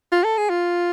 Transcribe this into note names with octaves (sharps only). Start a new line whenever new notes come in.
F4
A4
G#4
F4